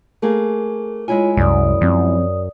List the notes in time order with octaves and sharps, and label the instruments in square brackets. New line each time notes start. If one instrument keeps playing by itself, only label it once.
[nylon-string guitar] A3 A#3 G#4
[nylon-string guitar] G#3 E4 G#5 [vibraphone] F4 C#5
[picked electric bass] C2 [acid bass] F#2 [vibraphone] D5 D#6
[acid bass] F#2 [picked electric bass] F3 C4